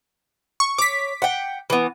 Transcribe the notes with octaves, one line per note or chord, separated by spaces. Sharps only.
C#6
C#5 D6 B6
F#5 G5
E3 B3